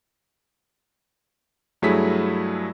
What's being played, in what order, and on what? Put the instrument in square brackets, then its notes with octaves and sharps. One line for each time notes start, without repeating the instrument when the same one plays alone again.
[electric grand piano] G2 F#3 A3 E4 G#4 B6